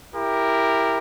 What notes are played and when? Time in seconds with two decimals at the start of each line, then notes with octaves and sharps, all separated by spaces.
0.14 E4 G4 A#4